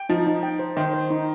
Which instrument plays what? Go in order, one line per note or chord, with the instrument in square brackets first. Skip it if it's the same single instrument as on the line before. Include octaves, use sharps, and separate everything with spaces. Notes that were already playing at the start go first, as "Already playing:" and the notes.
Already playing: [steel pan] G5
[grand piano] F3 [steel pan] D#4
[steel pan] D#4
G5
C5
[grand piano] D#3 [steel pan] C5
[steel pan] C5
D#4